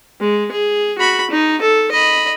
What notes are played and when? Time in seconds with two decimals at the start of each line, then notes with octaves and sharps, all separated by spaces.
0.21 G#3
0.52 G#4
0.99 F#4 B5
1.31 D#4
1.61 A4
1.91 D#5 B5